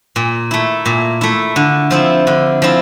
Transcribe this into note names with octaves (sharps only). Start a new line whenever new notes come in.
A#2
A3 E4
A#2
A3 E4
D3
F3 C4 E4
D3
F3 C4 E4